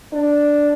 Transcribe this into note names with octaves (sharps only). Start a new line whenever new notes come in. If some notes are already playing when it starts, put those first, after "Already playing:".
D4